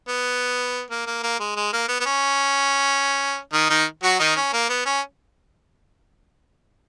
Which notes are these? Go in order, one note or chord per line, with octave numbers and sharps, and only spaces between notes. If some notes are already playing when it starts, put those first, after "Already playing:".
B3
A#3
A#3
A#3
G#3
G#3
A#3
B3
B3
C#4
D#3 D#4
D#3 D#4
F#3 F#4
D#3 D#4
C#4
A#3
B3
C#4